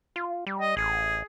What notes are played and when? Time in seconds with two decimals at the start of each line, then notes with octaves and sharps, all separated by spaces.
0.16 F4
0.47 G3
0.60 D#5
0.77 A1 G#4